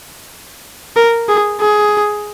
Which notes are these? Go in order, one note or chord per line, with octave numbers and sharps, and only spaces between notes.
A#4
G#4
G#4